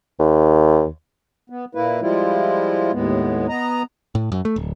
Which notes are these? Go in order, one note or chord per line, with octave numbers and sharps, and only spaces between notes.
D#2
B3
A#2 A#3 E4 B4
F3 G3 G#3 E4 F4
D#2 A2 G#3 B3
B3 D#5 A#5
A2
F#2
A3
D1